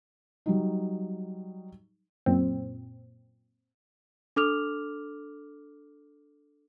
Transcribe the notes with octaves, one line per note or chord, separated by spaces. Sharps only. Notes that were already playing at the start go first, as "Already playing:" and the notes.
F#3 G3 D#4
F#2 A#2 C4
D4 A4 D6 F6 F7